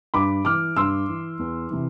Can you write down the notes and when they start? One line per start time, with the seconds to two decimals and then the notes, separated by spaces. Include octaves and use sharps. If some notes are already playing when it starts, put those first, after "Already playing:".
0.14 G2 B5 D6
0.45 E3 D6 F6
0.76 G2 C6 E6
1.09 E3
1.39 E2
1.70 C3 E3